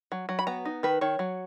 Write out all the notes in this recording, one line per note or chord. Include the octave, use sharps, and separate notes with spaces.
F#3
F#3
B5
B3 A#5
D#4
D#3 B4
D#3 C#5
F#3